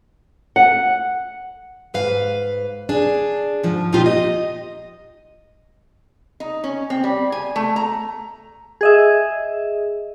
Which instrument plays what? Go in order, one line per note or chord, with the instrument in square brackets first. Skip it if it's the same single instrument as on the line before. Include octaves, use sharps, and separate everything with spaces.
[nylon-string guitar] F#5
[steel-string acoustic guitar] G#2 B4 F5
D4 G#4
G#2 F3
D2 A#2 A#3 D#4 F4 G4
D#5
[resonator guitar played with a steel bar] D#4
C#4
C4
G3
G#5
A3
A#5
[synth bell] G#4 D#5 E5